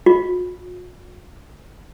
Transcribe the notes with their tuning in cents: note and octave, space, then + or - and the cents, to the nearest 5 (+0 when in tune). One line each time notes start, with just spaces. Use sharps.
F4 +45